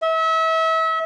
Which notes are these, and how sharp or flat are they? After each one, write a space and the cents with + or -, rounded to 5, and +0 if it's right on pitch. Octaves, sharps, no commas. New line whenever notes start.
E5 -35